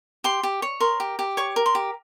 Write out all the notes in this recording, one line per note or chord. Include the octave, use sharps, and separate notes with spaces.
G4 C6
G4
C#5
A#4 C6
G4
G4
C#5 C#6
A#4
C6
G4